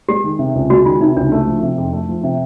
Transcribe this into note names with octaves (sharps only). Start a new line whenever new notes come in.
G#3 G4
D#3
C3
C#2
G#3 F#4
D#3 F4
C3 D#4
C#2 D4
A3
F3
C3
F2
A3
F3
C3